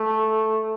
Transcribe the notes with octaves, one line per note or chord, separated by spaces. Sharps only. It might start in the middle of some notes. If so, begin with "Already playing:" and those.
Already playing: A3